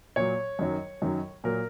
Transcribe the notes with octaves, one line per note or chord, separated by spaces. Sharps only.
A#2 F#3 C#5
F#2 D#3 F#3
F#2 D#3 F#3
A#2 F#3 A#4